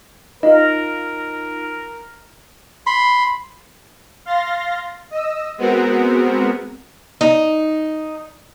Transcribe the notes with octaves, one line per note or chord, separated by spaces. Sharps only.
D#4 F4 A#4 D#5
B5 C6
F5 C6 A6 A#6
D#5 E6
G#3 B3 C4 F#4 A#4
D#4